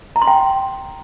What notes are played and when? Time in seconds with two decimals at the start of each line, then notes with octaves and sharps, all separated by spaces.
0.16 A#5
0.22 C6
0.27 G5